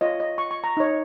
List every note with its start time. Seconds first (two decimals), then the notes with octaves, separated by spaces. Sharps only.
0.01 F4 C#5 D#5
0.20 D#5
0.38 C#6
0.51 C#6
0.64 A#5
0.77 D#4 C#5